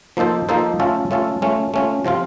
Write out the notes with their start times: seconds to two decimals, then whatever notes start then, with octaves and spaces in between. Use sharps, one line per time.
0.17 F3 A#3 D#4 A4 C5
0.49 F3 A#3 D#4 A4 C5
0.80 A3 C#4 F4 A4
1.11 A3 C#4 F4 A4
1.42 A3 C#4 F4
1.74 A3 C#4 F4
2.05 C3 F3 C4 F4